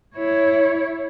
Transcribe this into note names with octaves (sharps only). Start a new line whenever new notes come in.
E4 C#5